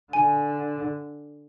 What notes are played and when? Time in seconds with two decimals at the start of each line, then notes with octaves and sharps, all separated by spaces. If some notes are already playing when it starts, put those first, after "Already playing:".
0.13 D3 G#5